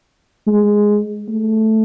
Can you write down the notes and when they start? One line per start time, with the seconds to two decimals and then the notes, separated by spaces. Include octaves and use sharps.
0.47 G#3
1.29 A3